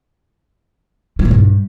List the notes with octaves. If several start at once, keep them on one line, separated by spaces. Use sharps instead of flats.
G3
B2
G2